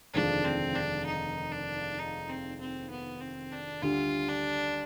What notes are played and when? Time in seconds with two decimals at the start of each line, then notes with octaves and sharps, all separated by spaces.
0.14 F1 D#2 D3 F3 G#3 D4
0.45 C4
0.75 D4
1.06 D#4
1.52 D4
1.99 D#4
2.29 C4
2.59 C4
2.90 B3
3.21 C4
3.52 D4
3.82 D2 D3 G3 F4
4.29 D4